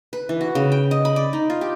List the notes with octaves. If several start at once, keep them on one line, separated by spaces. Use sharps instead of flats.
B4
E3
F#4
C#3
G5
D#5
B5
D5
D#4
F4
G4